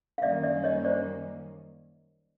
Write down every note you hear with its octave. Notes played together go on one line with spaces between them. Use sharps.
F5
F#2 D#3 G3 A#3 C#4 D5 E5
D5 E5
C#5 D#5
C5 D5